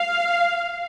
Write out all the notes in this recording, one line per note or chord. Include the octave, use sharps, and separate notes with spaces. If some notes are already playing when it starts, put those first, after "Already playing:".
Already playing: F5